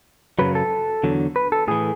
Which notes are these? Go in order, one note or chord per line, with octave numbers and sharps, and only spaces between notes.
F#2 C#3 F#3 B4
A4
E2 D3 F#3
B4
A4
A2 E3 G#4